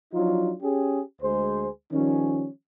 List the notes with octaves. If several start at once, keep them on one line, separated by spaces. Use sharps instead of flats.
F3 F#3 D4 D#4 F4 F#4
C#4 G4 G#4
D2 G#3 G#4 C5
D#3 F3 G3 C#4